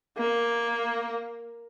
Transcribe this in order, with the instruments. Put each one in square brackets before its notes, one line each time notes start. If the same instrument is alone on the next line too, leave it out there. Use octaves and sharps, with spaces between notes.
[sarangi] A#3